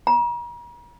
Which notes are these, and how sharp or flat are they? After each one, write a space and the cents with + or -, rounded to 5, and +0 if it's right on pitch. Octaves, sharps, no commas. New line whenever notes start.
A#5 +40